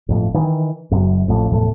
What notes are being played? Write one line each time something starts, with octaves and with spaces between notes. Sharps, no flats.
G1 F2 A2
D#3 E3
F#1 F#2
A1 F2 A2
F1 E2 A2 A3